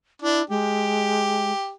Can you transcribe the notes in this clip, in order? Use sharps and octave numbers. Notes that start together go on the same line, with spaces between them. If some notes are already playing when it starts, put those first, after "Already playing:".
D4 E4
G#3 G4